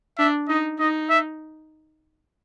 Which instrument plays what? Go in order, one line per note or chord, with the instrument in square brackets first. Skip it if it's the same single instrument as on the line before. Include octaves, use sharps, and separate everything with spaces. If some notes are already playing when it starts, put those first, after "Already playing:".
[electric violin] D4 [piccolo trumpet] E5
[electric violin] D#4 [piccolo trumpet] D#5
[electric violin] D#4 [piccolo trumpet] D#5
[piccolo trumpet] E5